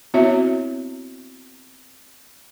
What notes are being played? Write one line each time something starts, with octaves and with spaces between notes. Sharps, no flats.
B3 C4 E4 F#4 C#5 E5